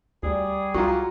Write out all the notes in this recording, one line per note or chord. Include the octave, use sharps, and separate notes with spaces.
D2 G3 G#4 D5
C2 F#3 F4 A#5 C#6